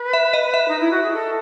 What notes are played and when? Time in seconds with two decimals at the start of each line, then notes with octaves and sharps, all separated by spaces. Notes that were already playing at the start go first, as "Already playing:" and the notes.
Already playing: B4
0.13 E5
0.33 D#5
0.54 E5
0.68 D#4
0.80 E4
0.91 F#4
1.03 G#4
1.14 A4